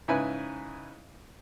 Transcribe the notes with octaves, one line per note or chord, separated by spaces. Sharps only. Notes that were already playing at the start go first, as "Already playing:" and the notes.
G#2 C#3 E4 B4 G#5 B5